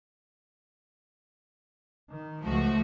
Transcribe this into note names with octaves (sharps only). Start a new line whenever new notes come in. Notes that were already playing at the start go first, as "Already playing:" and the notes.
D#3
C#2 F3 A3 F#4